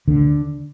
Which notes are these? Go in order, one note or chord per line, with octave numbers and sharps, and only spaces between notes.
D2 D3